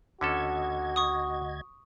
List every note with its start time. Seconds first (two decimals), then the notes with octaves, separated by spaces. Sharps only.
0.21 D2 D3 C#4 F#4 A4 D#5 G#6
0.96 C#6 D#6